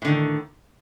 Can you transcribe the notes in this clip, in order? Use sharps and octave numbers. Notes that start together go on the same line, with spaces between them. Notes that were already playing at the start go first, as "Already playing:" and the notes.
A2 D3 D#3